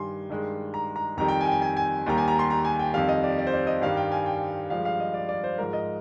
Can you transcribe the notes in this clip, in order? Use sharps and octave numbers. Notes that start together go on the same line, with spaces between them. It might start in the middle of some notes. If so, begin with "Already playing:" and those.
Already playing: G2 D#3 G3 G#5 C6
G2 D#3 G#3
A#5
A#5
F2 D#3 G3 A#5
G5
G#5
G5
G#5
G#5
G#5
D#2 D#3 G3 A#5
G#5
A#5
C6
A#5
G#5
G5
F2 D#3 G3 F5
D#5
D5
D5
C5
D5
D#5
G2 D#3 G3 F5
G5
G#5
G5
G2 F3 G#3 F5
F5
D#5
D5
D5
C5
G#2 F3 G#3 A#4
D#5